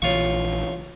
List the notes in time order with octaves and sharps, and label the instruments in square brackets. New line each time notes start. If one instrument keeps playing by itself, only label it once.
[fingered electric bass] A#1 E3 [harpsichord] F4 C#6 [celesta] C#5 F5